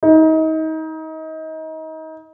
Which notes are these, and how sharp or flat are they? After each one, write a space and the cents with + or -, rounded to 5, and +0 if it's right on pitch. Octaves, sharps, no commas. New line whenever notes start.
D#4 +30